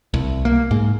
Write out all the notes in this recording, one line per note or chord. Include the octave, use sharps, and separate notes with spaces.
C2
A#3
G#2